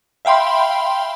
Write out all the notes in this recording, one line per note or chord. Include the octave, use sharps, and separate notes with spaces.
E5 F5 G5 B5 C6